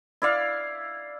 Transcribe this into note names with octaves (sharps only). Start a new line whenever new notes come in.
E4 D5 F5